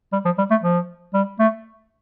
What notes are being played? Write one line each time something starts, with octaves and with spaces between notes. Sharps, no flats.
G3
F3
G3
A3
F3
G3
A3